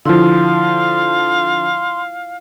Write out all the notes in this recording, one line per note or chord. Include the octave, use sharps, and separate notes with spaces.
D3 F3 E4 F4 F5 C6